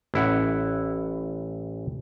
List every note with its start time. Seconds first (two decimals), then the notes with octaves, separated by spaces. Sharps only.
0.14 A1 E4 F#5